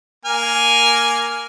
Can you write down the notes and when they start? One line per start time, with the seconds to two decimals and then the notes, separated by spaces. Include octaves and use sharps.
0.25 A#3 G#5 F6